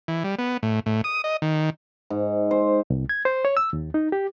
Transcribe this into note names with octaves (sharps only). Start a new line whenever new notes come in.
E3
G3
B3
A2
A2
D#6
D#5
D#3
G#2
C5
C2
G#6
C5
C#5
E6
D#2
D#4
G4